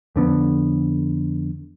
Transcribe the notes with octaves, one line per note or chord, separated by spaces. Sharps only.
F2 D3 B3